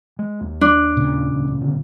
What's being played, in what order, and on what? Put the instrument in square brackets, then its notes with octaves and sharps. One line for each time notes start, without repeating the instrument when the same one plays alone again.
[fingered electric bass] G#3
D#2
[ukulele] D4
[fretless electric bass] A#2 C#3
[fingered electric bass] D#1 C#2
F#1 D3